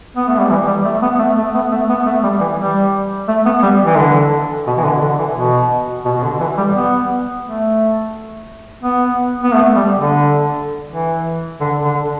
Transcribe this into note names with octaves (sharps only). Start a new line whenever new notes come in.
B3
A3
G3
E3
G3
A3
B3
A3
A3
B3
A3
B3
A3
G3
E3
G3
A3
B3
G3
E3
D3
B2
E3
D3
D3
E3
B2
B2
B2
D3
E3
G3
B3
A3
B3
B3
A3
G3
D3
E3
D3
D3